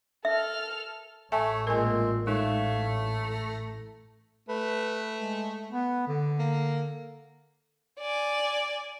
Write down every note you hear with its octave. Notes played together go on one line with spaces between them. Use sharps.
A4 E5 F6
A1 A3 C#5 E5 G#5 A5
A#2 G#3 C4 A#4 G#5
G#3 A3 D#4 C#5 E5 F5
A#5
A3 B4
G#3
B3
D3
A#3
D5 G#5